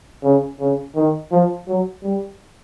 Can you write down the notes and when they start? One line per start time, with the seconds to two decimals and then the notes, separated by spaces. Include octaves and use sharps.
0.23 C#3
0.60 C#3
0.95 D#3
1.31 F3
1.67 F#3
2.03 G3